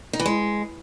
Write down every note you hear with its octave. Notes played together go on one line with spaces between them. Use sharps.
D#4
E3
G#3